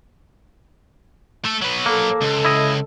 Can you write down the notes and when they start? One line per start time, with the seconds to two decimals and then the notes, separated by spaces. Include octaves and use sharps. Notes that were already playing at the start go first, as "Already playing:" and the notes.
1.45 A3 A4
1.62 F#3 B4
1.86 A#3 A4
2.22 C#2
2.45 E4 D#5